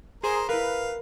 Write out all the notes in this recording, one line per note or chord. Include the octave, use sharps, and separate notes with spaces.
G#4 A#4 C5
E4 A#4 B4 F5